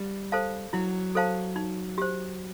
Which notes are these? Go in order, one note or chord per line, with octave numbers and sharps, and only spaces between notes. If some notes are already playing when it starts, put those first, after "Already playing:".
Already playing: G3
A4 C5 F5 A5
F#3 E4
A4 C5 F5 A5
D#4
G4 C5